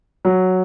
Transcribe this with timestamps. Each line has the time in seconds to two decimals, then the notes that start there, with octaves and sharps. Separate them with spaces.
0.25 F#3